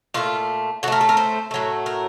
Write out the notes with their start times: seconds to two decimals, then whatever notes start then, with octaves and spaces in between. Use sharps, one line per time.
0.14 A#2 A3 F4
0.83 A2 F#4
0.88 A3 A#4
1.01 A4
1.09 A#4
1.17 C5
1.51 A2 F#3 A3
1.86 A#4